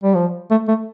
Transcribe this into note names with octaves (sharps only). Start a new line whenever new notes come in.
G3
F3
A3
A3